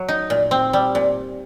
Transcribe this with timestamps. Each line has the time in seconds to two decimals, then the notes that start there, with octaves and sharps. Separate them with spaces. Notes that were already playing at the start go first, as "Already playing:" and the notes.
Already playing: F#3
0.08 D#4
0.30 A#2
0.51 C4
0.73 G3
0.95 A#2